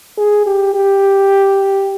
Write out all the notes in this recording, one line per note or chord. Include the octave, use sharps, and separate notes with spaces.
G#4
G4
G4